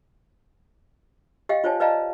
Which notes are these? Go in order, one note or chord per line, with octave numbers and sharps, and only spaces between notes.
G4 D#5 F5 G5
F4 C5 C#5 G#5 A5
B4 D5 D#5 F5 A5 A#5